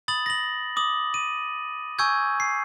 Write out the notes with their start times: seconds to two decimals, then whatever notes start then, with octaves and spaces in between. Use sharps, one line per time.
0.08 B5 D#6 A6 F#7
0.26 A#6 F#7
0.76 D6 D#6 F#7
1.14 D#7
1.99 G#5 C#6 E6 G6 G#6
2.40 C7